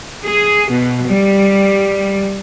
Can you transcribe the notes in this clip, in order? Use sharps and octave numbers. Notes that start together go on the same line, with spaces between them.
G#4
B2
G3